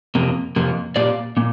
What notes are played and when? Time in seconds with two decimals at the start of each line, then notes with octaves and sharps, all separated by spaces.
0.15 F2 C3 A#3
0.56 F2 C3 A#3
0.96 A#2 A#3 G4 D5 F5
1.37 A#2 A#3